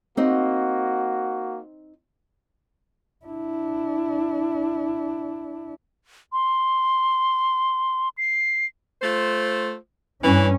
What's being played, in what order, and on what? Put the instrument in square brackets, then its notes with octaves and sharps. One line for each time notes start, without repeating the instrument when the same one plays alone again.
[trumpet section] A#3 F#4 [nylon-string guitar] C4 D#4
[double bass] D4 E4
[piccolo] C6
C7
[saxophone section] A3 F4 C5
[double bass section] G2 C#4 [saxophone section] E3 B4